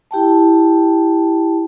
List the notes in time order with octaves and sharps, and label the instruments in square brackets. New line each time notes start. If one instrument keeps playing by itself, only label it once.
[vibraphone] E4 G4 G5 A5